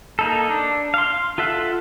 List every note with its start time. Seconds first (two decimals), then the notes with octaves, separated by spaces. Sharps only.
0.19 A#3 D#4 A4
0.50 D4
0.94 F5 C6
1.38 F4 A4 E5 F#5